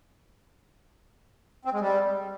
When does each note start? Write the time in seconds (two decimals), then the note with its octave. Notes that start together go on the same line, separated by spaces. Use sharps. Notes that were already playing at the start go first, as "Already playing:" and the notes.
1.65 C4
1.73 G#3
1.80 G3